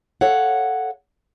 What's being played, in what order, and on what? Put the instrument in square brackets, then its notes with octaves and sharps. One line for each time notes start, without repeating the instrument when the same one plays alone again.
[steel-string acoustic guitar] A4 C#5 F5 F#5